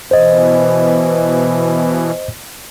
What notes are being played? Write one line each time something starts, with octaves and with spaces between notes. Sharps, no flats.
B2 E3 C5 D#5